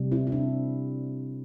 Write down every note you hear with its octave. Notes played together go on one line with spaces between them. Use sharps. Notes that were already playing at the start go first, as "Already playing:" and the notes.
Already playing: C3 G3
C4 E4
E4
D4